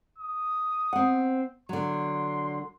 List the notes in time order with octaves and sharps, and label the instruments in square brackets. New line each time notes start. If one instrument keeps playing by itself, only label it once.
[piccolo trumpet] D#6
[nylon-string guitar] C4 F#5
[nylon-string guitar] D3 F#3 [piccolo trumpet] C6